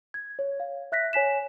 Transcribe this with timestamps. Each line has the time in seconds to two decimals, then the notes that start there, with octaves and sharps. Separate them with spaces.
0.14 G#6
0.39 C#5
0.60 F5
0.92 E5 F#6 A#6 B6
1.13 C#5 G#5 B6 E7